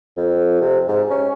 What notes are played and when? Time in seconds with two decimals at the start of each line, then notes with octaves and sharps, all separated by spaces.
0.17 F2
0.61 C3
0.88 G#2
1.10 C#4